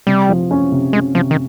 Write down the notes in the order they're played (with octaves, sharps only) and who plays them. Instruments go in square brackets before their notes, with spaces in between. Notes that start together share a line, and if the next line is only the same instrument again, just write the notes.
[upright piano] C3 [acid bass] G3
[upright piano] F3
C#4
C3
[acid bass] G#3 [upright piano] C#4
[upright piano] C3 [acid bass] F3
[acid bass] D#3